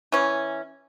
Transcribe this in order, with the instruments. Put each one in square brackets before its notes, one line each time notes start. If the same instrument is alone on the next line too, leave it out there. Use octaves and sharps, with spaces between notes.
[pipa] E3 C#4